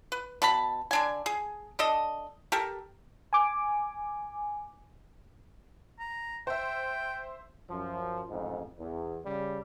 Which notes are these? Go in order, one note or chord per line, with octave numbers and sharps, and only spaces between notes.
B4
B2 A5 B5
D3 D4 G#5
G#4
D4 A4 D#5
G4 A4 A#4
G#5 D6
A#5
C5 E5 G5
F#2 F3
A1 F2 G#2
E2
C#3 G3